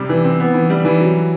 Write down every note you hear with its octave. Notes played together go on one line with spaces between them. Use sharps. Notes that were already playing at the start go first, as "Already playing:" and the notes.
Already playing: C3 G3 C4
E3
C4
B3
E3
G3
E3
F#3